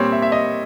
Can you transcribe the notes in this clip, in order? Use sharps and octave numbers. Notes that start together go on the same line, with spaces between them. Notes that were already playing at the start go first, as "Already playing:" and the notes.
Already playing: A#2 G3 C4 C#5
E5
E5
D#5